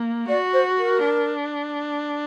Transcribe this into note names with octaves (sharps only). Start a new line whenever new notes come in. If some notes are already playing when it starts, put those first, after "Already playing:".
Already playing: A#3
F#4 D5
C5
A#4
D4